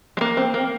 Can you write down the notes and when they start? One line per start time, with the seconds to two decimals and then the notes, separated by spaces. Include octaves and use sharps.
0.17 G#3
0.21 A#3
0.37 C4
0.54 A#3